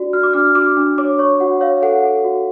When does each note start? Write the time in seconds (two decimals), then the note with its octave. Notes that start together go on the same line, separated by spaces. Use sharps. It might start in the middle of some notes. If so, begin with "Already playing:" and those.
Already playing: D4 F#4 D5
0.13 F#4 F6
0.23 D6
0.33 D4 F6
0.55 F#4 D6
0.77 D4
0.98 C#5 D6
1.19 C#5 C#6
1.40 F#4 F#5
1.61 C#5 F5
1.82 A4 F#5
2.03 A4
2.25 F#4